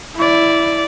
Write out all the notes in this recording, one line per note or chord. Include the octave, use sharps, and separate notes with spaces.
E4 D5